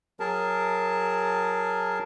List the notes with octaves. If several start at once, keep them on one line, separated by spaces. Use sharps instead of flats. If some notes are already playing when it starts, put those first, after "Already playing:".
F#3 G#4 A#4 A5